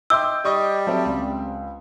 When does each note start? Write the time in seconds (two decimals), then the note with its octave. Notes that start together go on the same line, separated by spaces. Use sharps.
0.10 D#5 E5 G5 C6 D6 E6 G6
0.45 G3 D#5 C#6 D#6
0.87 F#3 C4 A4 E5
1.05 C#2